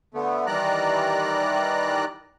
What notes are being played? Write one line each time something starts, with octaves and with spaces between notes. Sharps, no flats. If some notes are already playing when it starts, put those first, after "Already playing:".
D3 A3 B3
D#3 E3 G3 D5 A#5 F#6